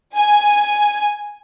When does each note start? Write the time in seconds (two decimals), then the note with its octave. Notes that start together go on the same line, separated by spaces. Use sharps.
0.15 G#5